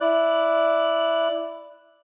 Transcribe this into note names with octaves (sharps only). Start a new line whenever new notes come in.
E4 D5 F#6